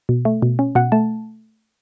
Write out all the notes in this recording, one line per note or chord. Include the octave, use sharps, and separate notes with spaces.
B2
A3
B2
C#4
B2 F#5
A3 A5